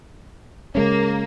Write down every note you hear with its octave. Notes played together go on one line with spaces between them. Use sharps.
C#3 G#3 A#3 C#4